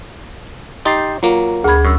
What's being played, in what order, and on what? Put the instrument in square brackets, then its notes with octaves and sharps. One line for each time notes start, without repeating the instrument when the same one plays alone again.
[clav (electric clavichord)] D#4 G4 G5 [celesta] C6 A6 C7
[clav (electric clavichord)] F#3 A#3 [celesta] F4
[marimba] D2 B5 [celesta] G#4 G#6
[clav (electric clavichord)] F#2 [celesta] C#6 E6